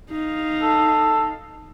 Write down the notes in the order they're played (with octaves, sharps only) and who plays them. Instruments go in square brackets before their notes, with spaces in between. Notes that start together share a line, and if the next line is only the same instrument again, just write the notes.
[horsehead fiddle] D#4 F5
[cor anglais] A4